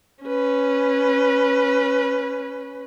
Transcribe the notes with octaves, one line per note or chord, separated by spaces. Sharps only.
C#4 B4